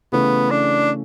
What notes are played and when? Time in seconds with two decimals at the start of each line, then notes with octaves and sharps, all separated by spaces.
0.12 C#3 E3 A3 B3 C#4
0.50 D4